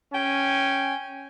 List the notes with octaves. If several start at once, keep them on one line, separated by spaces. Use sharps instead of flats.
C#4 G5 G#5